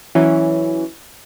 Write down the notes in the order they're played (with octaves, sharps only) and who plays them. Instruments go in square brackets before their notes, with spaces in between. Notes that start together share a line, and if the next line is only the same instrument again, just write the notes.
[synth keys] E3 F#3 C#4